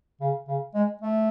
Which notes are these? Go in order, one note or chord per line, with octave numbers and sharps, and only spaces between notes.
C#3
C#3
G#3
A3